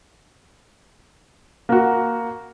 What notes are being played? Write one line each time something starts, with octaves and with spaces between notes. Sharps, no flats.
A#3 F#4